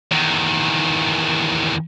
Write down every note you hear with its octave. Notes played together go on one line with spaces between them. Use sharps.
E2 D#3